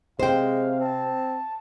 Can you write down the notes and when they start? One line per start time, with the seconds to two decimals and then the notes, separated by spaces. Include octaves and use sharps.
0.20 C3 G#3 C5 F5 G5
0.80 C4 A5